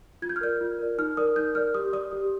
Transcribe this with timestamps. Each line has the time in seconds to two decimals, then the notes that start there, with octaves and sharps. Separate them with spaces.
0.22 F4 G#6
0.29 G6
0.36 F6
0.41 A#4 D5 G6
0.61 F4
0.79 A#4 D5
0.98 D#4 F6
1.17 A#4 D5 D#6
1.36 D#4 G6
1.55 A#4 D5 F6
1.74 G4 D#6
1.93 D5 D#6
2.13 G4